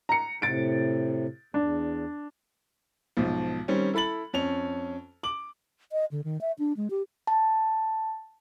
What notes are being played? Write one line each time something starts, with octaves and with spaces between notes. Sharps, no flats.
A#5 C#7
A2 C3 A6 D7
E2 D4
B1 G#2 F3
D#3 G3 C4 C#4
E4 A4 B5 A6 F#7
F2 C#4 F7
D6 F#7
D#5
D3
D#3
E5
D4
G#3
G4
A5